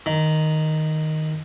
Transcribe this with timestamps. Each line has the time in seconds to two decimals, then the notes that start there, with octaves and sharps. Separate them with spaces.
0.06 D#3